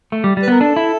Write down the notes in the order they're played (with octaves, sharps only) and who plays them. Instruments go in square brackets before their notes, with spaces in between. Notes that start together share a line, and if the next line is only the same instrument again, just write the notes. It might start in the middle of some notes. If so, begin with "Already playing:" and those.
[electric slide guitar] A3
G3
G3
[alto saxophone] B4
[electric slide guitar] B3 [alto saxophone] A#4
[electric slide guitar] D4 [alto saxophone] A4
[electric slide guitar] E4